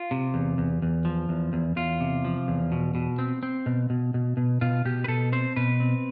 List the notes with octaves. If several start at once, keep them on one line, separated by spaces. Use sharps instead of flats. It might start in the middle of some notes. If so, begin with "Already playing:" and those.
Already playing: F4
C3
E2
E2
E2
F3
E2
E2
E2 F4
C3
F3
E2
B2
B2
C4
C4
B2
B2
B2
B2
B2 F4
B2 G4
B4
B2 A4
C4 C5
B2 B4
C4